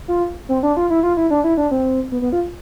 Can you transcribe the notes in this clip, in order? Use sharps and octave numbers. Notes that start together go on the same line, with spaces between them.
F4
C4
D4
F4
E4
F4
E4
D4
E4
D4
C4
B3
B3
F4